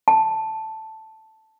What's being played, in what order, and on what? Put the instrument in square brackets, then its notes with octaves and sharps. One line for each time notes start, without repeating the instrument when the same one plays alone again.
[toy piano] A5